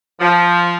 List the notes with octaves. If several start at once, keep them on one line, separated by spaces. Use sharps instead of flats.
F3